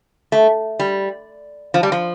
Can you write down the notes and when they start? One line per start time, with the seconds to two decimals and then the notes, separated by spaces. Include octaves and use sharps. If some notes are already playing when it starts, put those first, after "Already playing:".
0.32 A3
0.80 G3
1.74 F3
1.83 G3
1.92 F3